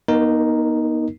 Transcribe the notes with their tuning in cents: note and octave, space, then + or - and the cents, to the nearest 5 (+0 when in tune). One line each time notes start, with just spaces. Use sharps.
B3 -40 D#4 +0 A#4 +0